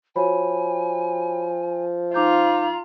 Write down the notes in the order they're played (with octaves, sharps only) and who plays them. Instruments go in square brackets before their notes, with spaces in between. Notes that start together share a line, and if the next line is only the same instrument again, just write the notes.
[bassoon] F3 [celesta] F#4 C#5 B5 [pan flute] G#5
[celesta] D#4 D6 G6 [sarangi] F4 [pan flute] A#5